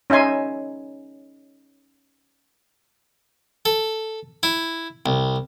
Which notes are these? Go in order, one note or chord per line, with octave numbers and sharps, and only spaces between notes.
C#4 D#4 E5 G#5 C6
A4
E4
C2